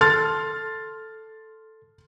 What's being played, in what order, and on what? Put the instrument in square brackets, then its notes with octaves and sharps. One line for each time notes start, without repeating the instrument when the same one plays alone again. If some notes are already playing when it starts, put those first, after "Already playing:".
[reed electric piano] A4 [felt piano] C6 F6 A6